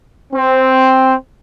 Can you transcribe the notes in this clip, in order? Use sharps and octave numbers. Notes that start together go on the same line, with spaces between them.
C4